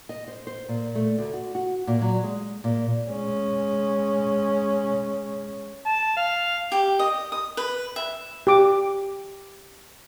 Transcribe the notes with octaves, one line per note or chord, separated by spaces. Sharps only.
D#5
C5
C5
A#2
A3
D2
F#4
F#4
A#2
F#3
G#3
A#2
G#3 C#4
A5
F5
G4
D#5
D#6
B4
E5
G4 D6